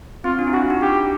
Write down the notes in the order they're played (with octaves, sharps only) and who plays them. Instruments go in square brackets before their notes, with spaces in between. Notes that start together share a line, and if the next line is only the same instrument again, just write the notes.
[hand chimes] C4 [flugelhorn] F4
[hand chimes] D4
E4
[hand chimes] F4 [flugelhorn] F#4
[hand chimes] D#4
[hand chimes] D4 [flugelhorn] G4